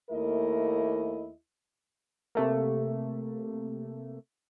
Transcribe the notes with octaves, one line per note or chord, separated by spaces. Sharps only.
D#2 A3 A#3 E4 A#4 D#5
C3 A3 A#3